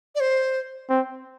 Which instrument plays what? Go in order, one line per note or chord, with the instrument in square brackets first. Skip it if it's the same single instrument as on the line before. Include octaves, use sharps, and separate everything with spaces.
[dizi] D5
C5
[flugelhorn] C4